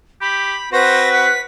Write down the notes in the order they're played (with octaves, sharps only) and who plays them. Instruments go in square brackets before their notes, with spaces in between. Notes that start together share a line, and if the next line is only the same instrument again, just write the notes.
[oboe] G4 [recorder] B5
[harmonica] C4 F#4 [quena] B4 [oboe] C5 [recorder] A#6
[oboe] F#5 [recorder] B6